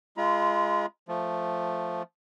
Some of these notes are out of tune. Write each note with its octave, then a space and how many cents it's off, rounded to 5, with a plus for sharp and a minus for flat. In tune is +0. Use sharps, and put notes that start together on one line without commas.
G#3 +0 F4 -25 A#5 +45
F3 +0 A3 +0